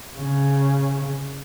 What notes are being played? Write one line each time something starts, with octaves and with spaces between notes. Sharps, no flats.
C#3